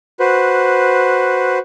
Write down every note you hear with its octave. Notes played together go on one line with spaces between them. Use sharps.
F#4 B4 C5